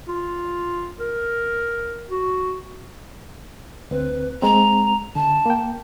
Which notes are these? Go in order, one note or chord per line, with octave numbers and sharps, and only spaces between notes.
F4
A#4
F#4
D2 C4 B4
G#3 C4 A#5
D3 A5
A#3 G5